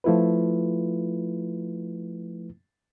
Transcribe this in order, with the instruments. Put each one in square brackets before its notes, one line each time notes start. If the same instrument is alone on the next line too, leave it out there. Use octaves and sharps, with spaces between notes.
[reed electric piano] F3 A3 E4 F4 B4